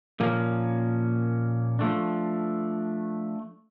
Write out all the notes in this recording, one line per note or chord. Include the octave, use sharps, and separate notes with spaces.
A#2 F3 A#3 C#4
F3 A3 D4